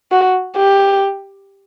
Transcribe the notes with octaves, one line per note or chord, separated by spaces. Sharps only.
F#4
G4